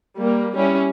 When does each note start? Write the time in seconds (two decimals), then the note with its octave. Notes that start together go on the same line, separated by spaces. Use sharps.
0.19 G3 A#3
0.56 G3 C#4 E4